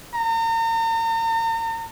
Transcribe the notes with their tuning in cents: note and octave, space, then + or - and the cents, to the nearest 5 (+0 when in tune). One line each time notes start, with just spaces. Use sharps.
A#5 -40